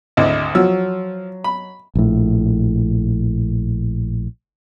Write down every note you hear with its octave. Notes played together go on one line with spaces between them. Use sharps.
G#1 D2 E4 D#5
F3 F#3 E6
B5
A#1 A2